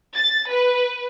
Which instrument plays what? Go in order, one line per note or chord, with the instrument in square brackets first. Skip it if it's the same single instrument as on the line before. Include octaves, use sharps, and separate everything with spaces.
[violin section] A6
B4